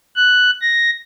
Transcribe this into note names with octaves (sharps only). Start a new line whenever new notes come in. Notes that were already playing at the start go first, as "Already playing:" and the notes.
F#6
A#6